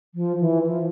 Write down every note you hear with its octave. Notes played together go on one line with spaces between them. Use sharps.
F3
E3
F3